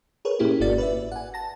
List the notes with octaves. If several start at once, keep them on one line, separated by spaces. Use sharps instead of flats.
G#4 A#4 B4 C#5
A#2 A#3 C#4 E4 G4 G#4
G1 G#2 A#3 F#4 D5 A6
B4 D5 E5
F#5 G#5
A5 A#6